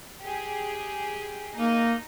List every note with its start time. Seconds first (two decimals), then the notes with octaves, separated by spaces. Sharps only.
0.22 G4 G#4
1.57 A#3 D#4